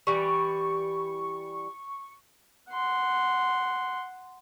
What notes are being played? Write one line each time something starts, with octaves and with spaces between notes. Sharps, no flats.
E3 G3 C#6
F#5 C6